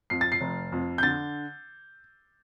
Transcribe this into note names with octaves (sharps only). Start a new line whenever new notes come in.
F2 C7
A6
C7
F1
F2
G6
D3 A6